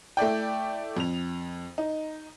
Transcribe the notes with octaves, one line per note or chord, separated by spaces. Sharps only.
A3 E4 D5 G5
F2 F7
D#4